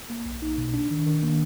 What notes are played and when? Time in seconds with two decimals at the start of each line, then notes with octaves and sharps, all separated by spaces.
0.10 A#3
0.26 B1
0.42 D#4
0.58 B2
0.74 D4
0.91 D#3
1.06 D#3
1.23 A#3